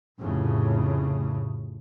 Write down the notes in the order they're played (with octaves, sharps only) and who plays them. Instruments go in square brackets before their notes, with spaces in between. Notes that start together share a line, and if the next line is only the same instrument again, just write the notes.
[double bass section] F1 A2 C#3